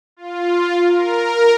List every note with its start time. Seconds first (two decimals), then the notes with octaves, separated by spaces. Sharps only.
0.17 F4
0.88 A#4